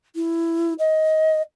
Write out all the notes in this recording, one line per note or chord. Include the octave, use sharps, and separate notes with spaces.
E4
D#5